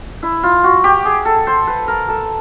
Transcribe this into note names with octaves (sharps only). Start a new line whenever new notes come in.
E4
F4
F#4
G4
G#4
A4
C5
B4
A#4
A4